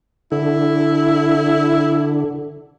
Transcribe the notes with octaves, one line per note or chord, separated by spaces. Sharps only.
D3 E4